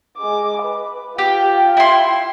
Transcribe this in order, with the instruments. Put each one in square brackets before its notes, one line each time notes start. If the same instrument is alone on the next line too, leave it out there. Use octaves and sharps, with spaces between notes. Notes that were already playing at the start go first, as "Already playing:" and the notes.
[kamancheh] G#3 D6
B4
[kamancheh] F4 G5 [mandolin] G4
[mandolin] E4 C6